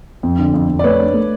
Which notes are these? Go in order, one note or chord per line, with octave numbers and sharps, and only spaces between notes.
F2
D3
F2
F2
D5
A3 B4 C#5
D4
A3